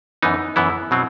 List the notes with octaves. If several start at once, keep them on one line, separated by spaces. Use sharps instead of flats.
F#2 E3 B3 D#4
F#2 E3 B3 E4
B2 F#3 C4